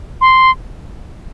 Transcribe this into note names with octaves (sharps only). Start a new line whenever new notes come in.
C6